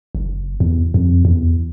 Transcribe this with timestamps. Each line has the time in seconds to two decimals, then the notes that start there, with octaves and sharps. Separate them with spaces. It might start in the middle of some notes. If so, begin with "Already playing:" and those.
0.15 F#1
0.60 E2
0.94 F2
1.25 E2